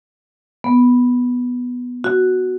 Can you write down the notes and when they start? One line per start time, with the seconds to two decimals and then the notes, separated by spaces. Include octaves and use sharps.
0.64 B3
2.04 F#4